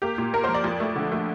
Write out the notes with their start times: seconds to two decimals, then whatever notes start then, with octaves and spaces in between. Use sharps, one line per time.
0.02 A#3 G4
0.18 A#2
0.33 A#3 A#4
0.44 C5
0.48 F3
0.54 D5
0.64 F2
0.80 A3
0.96 D3
1.12 A3